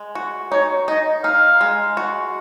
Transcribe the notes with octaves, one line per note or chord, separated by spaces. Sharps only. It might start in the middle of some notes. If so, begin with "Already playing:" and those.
Already playing: G#3
F#4
D#4 C#5
D#4 D#5
D#4 F5
G#3
F#4